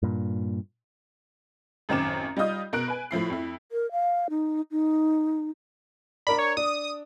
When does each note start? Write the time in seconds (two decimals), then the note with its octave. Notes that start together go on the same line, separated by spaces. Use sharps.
0.03 G2 A#2
1.89 A1 F#2 D#3 C4 D6 E7
2.37 G3 D#4 F4 D#5 D#6 G6
2.73 B2 A#4 F#6 D7
2.88 B4 G#5
3.11 A2 F3 E4 C7
3.30 F2 E4
3.72 A#4
3.92 F5
4.30 D#4
4.71 D#4
6.27 D4 A#4 D5 B5
6.39 C#5
6.57 D4 D#6